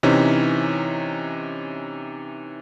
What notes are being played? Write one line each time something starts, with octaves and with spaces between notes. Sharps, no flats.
C3 E3 C#4 D#4